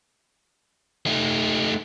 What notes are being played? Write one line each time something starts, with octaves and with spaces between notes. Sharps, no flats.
A3 D#4